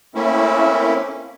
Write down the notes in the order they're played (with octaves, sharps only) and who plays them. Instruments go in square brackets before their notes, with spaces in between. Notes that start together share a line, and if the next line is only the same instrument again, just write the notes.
[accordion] A3 A#3 C4 C#4 E4